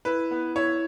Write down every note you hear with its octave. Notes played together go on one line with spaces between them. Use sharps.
E4 B4
B3
E4 C#5